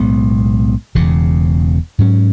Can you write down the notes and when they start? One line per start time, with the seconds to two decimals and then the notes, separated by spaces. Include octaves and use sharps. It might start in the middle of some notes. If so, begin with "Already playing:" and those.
Already playing: B1 A2 G#3 B3
0.95 E1 E2 C#3
1.99 G#2 F#3 C#4